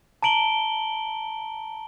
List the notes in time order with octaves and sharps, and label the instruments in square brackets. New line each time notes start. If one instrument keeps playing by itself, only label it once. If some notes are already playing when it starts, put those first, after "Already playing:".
[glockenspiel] A5 A#5 D7 F#7 G7